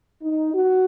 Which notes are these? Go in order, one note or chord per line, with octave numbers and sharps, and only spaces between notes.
D#4
F#4